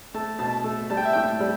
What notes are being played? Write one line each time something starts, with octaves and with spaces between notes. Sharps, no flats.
A3 A5
B2 A5
A3
G3 A5
G5
E5
A2 G5
G3